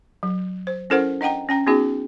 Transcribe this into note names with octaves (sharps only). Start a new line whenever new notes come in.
F#3
C5
C#4 E4 A4 A#4 C5 F#5
D4 D#5 F#5 G5 A#5
C#4 G5 A#5
B3 C#4 D#4 F#4 G#4